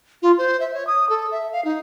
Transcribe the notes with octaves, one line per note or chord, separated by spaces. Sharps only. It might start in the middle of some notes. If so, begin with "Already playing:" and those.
F4
C5
E5
C#5
D#6
A4
E5
F5
D#4